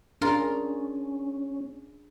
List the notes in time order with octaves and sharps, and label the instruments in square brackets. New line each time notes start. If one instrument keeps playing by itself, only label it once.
[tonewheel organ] C#4 [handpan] D4 G#4 [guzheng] F4 A#4